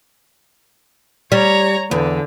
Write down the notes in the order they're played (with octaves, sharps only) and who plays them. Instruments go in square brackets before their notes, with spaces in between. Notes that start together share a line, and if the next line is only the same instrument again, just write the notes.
[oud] G3 [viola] C#5 A#5
[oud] E2 [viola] D3